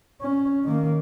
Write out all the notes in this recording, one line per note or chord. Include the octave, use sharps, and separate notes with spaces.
C#4
D#3 A#3